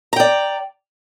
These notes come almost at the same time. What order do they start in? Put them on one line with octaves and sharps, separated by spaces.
A#5 G5 D5